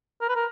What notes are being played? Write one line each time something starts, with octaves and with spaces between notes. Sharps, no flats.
A#4
B4
A#4